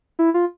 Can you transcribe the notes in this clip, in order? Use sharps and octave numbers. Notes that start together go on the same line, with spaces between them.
E4
F4